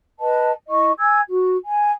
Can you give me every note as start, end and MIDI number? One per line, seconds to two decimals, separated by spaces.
0.19 0.50 71
0.19 0.50 75
0.19 0.50 81
0.69 0.91 64
0.69 0.91 75
0.69 0.91 85
0.98 1.19 80
0.98 1.19 88
0.98 1.19 92
1.28 1.56 66
1.66 1.91 80